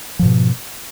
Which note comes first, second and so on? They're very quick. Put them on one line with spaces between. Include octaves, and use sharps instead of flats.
F3 G#2 B2